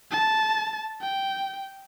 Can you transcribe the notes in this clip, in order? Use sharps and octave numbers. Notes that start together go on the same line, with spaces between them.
A5
G5